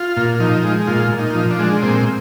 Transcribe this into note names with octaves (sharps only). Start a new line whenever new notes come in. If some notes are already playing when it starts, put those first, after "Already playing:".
Already playing: F4
A#2
F3 D#4
G#3
A#2 F4
A#2
D#4
F3
D4
G#3
A#2 C4